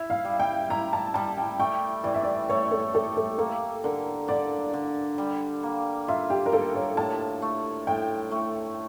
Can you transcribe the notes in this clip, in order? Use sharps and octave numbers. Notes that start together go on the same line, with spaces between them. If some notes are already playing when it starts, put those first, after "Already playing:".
Already playing: E4 E5
F5
G3
G5
E4 A#5
A5
G3 A5
G5
A3 G5
E3 D5
E5
D5
A3 C#5
A4
G4 A4
A4
A#3 A4
D3 A#4
D3 D5
D3
G3
A#3
F4 E5
G4
A#4
A#3 A4
C#5
A2 A5
A3
A2 G5
A3